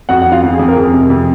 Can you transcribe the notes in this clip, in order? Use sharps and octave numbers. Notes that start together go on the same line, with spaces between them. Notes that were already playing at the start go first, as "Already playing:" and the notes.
F2 F#4 F#5
F2 F#5
F4 F5
F2
G#4
F2
A#4
F2 G#4
C3
F2